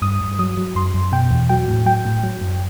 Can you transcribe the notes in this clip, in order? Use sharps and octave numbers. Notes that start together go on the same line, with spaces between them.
G2 D#6
G2
F#3 D#6
F#3
F#2 C6
F#2
B2 G5
E2
F#3 G5
A2
F#3 G5
A2
F#3
F#2